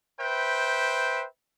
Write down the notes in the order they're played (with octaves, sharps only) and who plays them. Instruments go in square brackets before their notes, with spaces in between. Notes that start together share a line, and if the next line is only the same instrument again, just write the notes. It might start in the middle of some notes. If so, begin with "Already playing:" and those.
[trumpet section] B4 C5 E5 G5